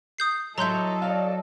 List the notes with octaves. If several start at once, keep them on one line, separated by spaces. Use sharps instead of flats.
D#6 G6 C7
F#3 E4 A4 D#5 A#5 C6 G6
D5 F5